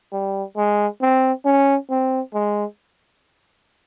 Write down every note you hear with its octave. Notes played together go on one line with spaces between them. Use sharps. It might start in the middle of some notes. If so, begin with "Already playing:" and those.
G3
G#3
C4
C#4
C4
G#3